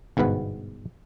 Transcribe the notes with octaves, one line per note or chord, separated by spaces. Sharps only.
G1 G#2 B2 B4 F#5